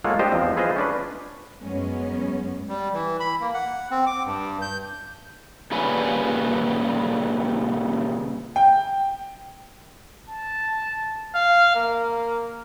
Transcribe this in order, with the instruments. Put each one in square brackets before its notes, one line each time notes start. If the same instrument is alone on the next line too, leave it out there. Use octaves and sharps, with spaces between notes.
[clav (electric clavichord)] G#3 A#3 F4 A4 C#5 F#5
D4 G4 C5 D#5
E2 F3 G#3 C4
E4 F4 G#4 B4 C5 D#5
C#4 D4 B4
[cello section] F#2 F#3 G#3 B3 C#4
[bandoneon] G3
E3
B5
A#3
F#5
C4
D6
G2
G6
[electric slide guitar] A#2 C#3 G3 C#4 B4 G#5
[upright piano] G5
[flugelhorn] A5
F5
A#3